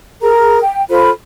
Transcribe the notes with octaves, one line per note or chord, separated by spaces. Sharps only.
G#4 A#4 A#5
G5
F4 A4 C5 B5